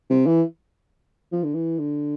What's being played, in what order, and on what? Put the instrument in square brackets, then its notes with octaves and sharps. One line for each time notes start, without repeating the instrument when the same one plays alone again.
[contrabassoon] C3
E3
F3
D3
E3
D3